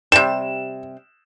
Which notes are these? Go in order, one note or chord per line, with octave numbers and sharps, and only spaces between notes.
C3 G3 E7